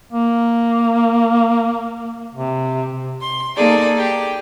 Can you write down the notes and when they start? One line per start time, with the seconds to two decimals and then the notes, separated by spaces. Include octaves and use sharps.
0.13 A#3
2.35 C3
3.21 C6
3.56 A#3 D#4 G#4 A4 D5
3.97 G4